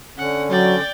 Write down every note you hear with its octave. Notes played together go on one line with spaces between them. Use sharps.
D3 C#4 F#5
F#3 D5 G5